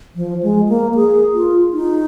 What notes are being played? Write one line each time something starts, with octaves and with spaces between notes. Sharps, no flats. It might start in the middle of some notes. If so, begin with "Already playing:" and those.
F3
G#3
A#3
G#4
F4
D#4